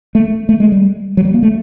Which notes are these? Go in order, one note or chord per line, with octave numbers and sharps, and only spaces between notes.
A3
A3
G#3
G3
F#3
G3
A#3
A3